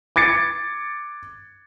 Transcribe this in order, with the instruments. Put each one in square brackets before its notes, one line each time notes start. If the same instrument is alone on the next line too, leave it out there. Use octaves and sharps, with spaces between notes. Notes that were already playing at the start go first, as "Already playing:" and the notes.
[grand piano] D6 G#6 A6 C#7